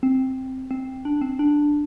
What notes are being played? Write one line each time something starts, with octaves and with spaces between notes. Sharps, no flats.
C4
C4
D4
C4
D4